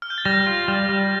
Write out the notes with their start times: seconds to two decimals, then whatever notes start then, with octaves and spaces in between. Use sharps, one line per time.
0.02 F6
0.10 G6
0.18 A6
0.25 G3 A#6
0.47 F4
0.68 G3
0.89 G3